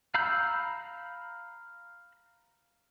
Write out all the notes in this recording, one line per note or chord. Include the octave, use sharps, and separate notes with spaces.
F5 A#5 B5 E6 G6